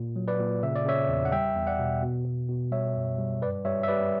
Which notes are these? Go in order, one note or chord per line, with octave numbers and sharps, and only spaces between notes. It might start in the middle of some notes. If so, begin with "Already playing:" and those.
Already playing: A#2
F#3
B4 D5
A#2
C#3 E5
D5
C#3 C#5 E5
E2
F#5
G3 E5 G5
E2
D5 F#5
B2
B2
B2
B2
G3 C#5 E5
F#2
G3
G2 B4 D5
G3 C#5 E5
E5
G3 B4 D5